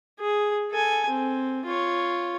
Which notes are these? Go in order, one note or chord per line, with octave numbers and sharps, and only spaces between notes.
G#4
A4 G#5
C4
F4 C#5